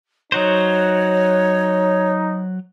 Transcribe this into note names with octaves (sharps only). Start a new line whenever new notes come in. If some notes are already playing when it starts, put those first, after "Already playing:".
F#3 D#4 F#4 C5 C#5